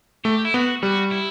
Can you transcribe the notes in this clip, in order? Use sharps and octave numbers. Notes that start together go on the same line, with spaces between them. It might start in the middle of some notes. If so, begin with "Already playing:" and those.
A3 G4
E4
B3 F#4
G3 F#4
E4